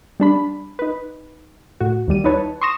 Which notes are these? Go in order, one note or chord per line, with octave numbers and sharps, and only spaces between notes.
G3 D4 B5
D#4 B4
A2 F#4
D#2 D#3 G3 D#7
D#4 E4 B4 C#5 A5
C6 C#6 D#6 A#6 E7